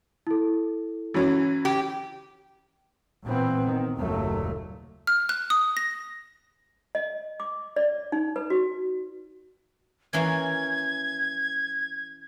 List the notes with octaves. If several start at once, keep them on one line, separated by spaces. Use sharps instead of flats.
E4 A4
E3 F#3 C#4
G4
A#2 E3 B3 C4
D#3
F#1 D#2 A#2 F#3 A3
F6
F#6
D#6
A#6
D#5
D6
D5
D#4
B4
F#4
E3 A#3 C#4 G#6